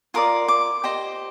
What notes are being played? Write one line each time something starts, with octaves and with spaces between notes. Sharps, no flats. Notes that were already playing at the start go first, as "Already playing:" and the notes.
F4 A#4 D5 D#6
D6
G4 C5 D#5